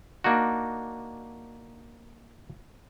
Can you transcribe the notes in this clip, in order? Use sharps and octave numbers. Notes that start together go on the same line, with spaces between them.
A#3 D4 D#4 F#4